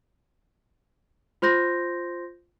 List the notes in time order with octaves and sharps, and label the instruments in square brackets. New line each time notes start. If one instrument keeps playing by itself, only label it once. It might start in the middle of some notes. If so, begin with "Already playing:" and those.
[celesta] F4 C5 C6 G6 A#6